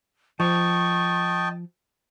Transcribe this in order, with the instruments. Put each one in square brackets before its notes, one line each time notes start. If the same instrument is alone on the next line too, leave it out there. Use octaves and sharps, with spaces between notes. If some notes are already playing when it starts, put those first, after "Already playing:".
[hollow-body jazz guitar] F3 [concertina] D#5 G5 A5 [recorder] C#6